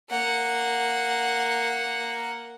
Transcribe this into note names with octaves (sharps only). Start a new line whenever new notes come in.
A#3 F#5